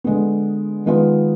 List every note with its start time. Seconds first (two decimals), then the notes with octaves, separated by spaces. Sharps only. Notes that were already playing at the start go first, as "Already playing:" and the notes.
0.04 D3 G#3 B3
0.86 D#3 G#3 B3 F4 B4